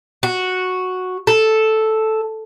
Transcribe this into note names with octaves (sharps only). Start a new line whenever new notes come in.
F#4
A4